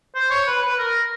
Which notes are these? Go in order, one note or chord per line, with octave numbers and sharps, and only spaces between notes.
C5
C#5
B4
B4
A#4